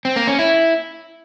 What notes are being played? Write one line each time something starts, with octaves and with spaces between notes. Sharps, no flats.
C4
A#3
C#4
E4